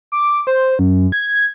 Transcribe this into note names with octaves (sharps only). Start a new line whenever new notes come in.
D6
C5
F#2
G#6